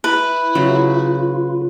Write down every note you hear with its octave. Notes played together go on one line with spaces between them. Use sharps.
E4 B4
C#3 F#3 F4